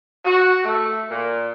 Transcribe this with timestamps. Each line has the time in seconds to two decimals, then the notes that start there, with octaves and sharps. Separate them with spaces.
0.25 F#4
0.64 A3
1.10 A#2